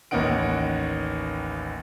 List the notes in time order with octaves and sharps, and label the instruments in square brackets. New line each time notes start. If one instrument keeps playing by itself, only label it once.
[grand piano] A1 D#2 C#4 D#4 F#5 D7